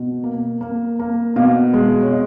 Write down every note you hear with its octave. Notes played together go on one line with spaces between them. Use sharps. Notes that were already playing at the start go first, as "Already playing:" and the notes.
Already playing: B2
A#3
A#3
A#3
B2 F5
G#3
C#5
B2 D#5